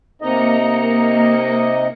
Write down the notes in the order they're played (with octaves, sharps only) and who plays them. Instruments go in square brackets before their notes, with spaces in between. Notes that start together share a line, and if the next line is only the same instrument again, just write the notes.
[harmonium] C3 D#4 D#5 [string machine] A#3 A#5 C#7